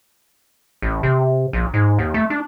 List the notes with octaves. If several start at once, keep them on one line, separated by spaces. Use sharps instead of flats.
A1
C3
A#1
G#2
D#2
A3
D4